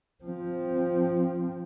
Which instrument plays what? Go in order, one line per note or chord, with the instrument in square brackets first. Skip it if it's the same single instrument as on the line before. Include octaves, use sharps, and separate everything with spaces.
[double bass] F3 C4